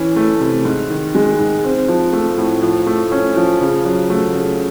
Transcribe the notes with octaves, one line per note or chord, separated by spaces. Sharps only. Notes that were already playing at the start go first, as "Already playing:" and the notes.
Already playing: E3 C#4
A3
C3
G#2
D#3
G#3
G#2
C4
F3
A3
A2
F3
A3
C#4
F3
C#3
F#3
A3
C#3